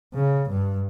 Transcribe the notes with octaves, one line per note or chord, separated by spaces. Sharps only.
C#3
G2